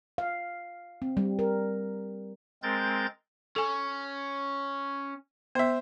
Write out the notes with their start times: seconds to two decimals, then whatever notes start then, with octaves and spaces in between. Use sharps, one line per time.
0.18 F5
1.02 C4
1.17 G3
1.39 A#4
2.63 G#3 C4 A#4 G6 A6
3.56 C#4 A4 G#5
5.55 B3 C5 E5